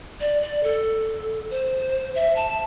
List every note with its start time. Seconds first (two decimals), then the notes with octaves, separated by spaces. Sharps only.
0.20 D5
0.42 D5
0.64 A4
1.50 C5
2.15 E5
2.36 A5